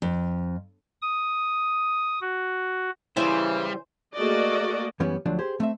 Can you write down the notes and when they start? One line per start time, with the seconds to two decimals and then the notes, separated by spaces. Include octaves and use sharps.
0.02 F2
1.02 D#6
2.21 F#4
3.17 C#3 E3 G3 E4 C5 G#5
4.15 A3 A#3 F#4 G#4 D5 D#5
5.00 F#2 E3 G3 B3 C#4
5.26 D2 F3 F#3 D4
5.39 G4 G#4 C5
5.60 A3 C4 E5